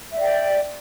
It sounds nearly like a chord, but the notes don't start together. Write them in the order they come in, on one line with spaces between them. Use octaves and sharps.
E5 D5 G5